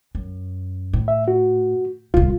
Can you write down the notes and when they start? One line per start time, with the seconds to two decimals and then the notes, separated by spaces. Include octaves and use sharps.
0.15 F#2
0.93 A2
1.08 E5
1.28 F#4
2.14 D1 C2 F4